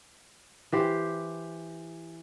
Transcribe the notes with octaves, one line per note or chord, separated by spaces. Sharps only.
E3 G4 C5